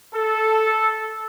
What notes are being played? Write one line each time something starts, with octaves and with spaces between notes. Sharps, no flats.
A4